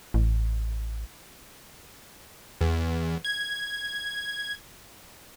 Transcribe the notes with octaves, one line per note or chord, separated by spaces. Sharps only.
A1
E2
G#6